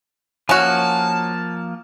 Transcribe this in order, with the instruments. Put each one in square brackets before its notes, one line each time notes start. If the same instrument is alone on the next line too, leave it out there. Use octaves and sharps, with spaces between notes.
[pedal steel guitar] F3 A#3 [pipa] C#4 F#4 [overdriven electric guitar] A5